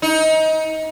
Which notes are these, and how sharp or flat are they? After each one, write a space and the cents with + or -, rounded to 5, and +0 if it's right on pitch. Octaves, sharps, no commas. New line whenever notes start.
D#4 +25